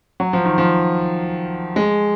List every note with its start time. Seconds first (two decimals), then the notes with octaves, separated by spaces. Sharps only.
0.20 F#3
0.33 F3
0.45 D#3
0.58 F3
1.76 G#3